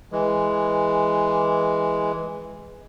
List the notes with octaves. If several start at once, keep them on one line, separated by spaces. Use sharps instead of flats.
E3 G#3